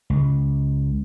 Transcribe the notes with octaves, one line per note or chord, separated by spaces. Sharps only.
C#2